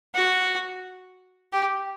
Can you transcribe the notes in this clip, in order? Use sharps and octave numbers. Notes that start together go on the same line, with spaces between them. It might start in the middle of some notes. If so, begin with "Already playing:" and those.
F#4
G4